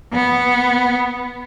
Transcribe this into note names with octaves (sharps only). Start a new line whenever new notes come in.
B3